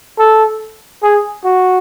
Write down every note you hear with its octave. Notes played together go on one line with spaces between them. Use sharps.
A4
G#4
F#4